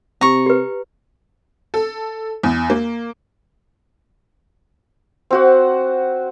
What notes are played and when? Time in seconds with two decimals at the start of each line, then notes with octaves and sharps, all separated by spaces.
0.21 C3 A#5 C#6
0.46 G4 B4
1.74 A4
2.43 E2
2.70 A#3
5.31 C4 F#4 F#5